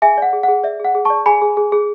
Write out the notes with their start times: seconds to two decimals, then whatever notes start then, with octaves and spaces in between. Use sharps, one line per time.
0.02 G#4 E5 G#5
0.18 D5 F#5
0.33 G#4
0.43 G#4 F#5
0.64 D5 E5
0.80 G#4 F#5
0.95 G#4
1.05 D5 A5 C#6
1.26 G#4 G#5 B5
1.42 G#4
1.57 G#4
1.72 G#4